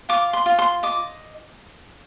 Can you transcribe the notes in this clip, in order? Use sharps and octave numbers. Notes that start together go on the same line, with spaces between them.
F4 D6
C6
F4
C6
D#5 D6